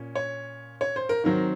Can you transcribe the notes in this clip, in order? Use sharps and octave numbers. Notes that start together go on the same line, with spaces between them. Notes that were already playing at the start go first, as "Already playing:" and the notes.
Already playing: A#2 C#4
C#5
C#5
C5
A#4
D#3 F#3 C4 A#4